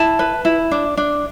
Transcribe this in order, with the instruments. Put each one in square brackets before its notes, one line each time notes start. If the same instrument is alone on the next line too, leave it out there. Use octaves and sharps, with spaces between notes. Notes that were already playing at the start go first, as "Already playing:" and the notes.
Already playing: [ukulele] E4 A5
B4
E4
D4
D4